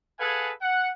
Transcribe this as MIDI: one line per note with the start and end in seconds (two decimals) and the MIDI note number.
0.20 0.51 68
0.20 0.51 69
0.20 0.51 71
0.20 0.51 77
0.20 0.51 78
0.20 0.51 80
0.61 0.91 78